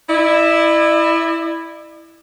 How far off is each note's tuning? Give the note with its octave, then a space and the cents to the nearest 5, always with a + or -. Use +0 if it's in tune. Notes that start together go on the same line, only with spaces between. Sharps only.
E4 +0 D5 +45